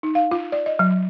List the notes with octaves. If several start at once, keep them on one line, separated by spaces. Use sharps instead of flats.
D#4
F5
F4
D5
D#5
F#3